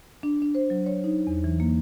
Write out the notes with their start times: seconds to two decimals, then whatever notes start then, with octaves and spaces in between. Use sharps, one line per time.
0.23 D4
0.42 D4
0.55 C5
0.70 F#3
0.86 C#5
1.04 D#4
1.27 E2
1.44 E3
1.60 A#3